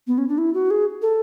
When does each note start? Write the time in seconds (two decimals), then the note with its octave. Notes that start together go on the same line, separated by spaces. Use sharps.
0.07 B3
0.18 C#4
0.28 D4
0.38 E4
0.54 F#4
0.71 G#4
1.02 A4